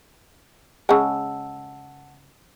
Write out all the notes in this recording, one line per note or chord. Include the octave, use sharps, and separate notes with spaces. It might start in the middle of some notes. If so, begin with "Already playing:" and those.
C#3 G#3 F#5 A5 E6